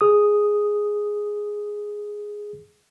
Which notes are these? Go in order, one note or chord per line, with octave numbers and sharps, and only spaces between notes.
G#4 D#6